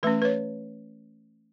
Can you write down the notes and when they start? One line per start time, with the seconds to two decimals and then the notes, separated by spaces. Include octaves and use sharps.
0.03 E3 A3 C#4 B4
0.22 B4
0.25 C#5